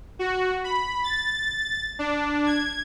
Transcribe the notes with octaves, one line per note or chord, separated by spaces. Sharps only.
F#4
B5
A6
D4
G#6